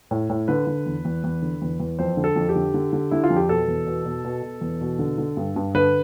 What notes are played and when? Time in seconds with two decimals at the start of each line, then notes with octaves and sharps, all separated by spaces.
0.11 A2
0.30 A2
0.48 D3 B4
0.67 D3
0.86 E2
1.05 E2
1.24 E2
1.42 D3
1.62 E2
1.80 E2
1.99 F2 C5
2.17 D3
2.24 A4
2.36 F2
2.49 G4
2.55 D3
2.74 D3
2.93 D3
3.11 D3 E4
3.24 F4
3.30 F2
3.36 G4
3.49 B2 A4
3.68 E2
3.87 B2
4.05 B2
4.24 B2
4.43 B2
4.61 E2
4.81 B2
4.99 D3
5.18 D3
5.37 G2
5.56 G2
5.74 D3 B4